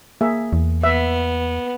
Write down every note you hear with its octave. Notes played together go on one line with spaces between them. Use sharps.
A#3 G#4 E5
E2
B3 E5